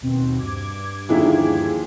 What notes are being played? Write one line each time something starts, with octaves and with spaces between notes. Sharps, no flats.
D#2 B2 C4
G2 D6 G#6
D#2 D3 F3 D#4 E4 G#4